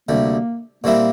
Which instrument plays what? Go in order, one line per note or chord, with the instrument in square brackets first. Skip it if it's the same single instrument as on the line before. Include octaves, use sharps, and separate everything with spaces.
[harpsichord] D2 C3 G3 [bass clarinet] A#3
[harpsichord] A#2 G3 C4 E4 A#4 [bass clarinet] A#3